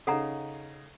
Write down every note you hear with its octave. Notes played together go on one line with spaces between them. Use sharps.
C#3 D#4 A4 F#5 A#5